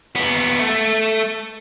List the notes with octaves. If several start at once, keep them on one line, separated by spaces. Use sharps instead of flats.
D#2 B3
A3